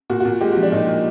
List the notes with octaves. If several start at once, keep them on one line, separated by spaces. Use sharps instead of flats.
A#2 F#4
F#4
A#2
G#3 G4
F#4
F3
D4
A#2 D#4
A#2